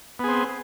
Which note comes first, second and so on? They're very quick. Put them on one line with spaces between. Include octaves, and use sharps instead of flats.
B3 G#4 C4